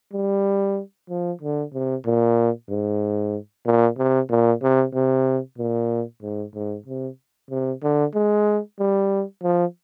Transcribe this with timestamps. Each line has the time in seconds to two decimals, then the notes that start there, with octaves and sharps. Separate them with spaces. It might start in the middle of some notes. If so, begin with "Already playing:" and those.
0.13 G3
1.09 F3
1.41 D3
1.73 C3
2.06 A#2
2.70 G#2
3.66 A#2
3.98 C3
4.30 A#2
4.62 C3
4.94 C3
5.58 A#2
6.22 G#2
6.54 G#2
6.86 C3
7.50 C3
7.83 D3
8.15 G#3
8.79 G3
9.43 F3